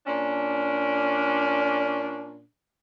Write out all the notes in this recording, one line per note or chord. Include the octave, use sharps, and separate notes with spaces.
A#2 C#4 D4